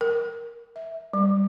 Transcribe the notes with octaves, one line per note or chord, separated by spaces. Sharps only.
A#4
E5
G3